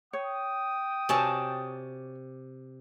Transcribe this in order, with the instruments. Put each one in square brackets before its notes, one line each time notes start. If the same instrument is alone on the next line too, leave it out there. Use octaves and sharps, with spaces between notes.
[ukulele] C#5 [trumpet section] G5 D#6
[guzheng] C3 D5 A5 [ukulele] F#4 C#5 G#5